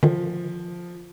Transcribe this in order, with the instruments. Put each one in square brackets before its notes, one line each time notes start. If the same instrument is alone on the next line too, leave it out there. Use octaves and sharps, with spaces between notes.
[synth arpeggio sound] D3 D#3 [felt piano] F3